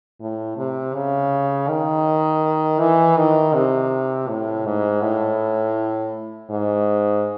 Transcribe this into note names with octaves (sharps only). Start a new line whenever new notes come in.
A2
C3
C#3
D#3
E3
D#3
C3
A2
G#2
A2
G#2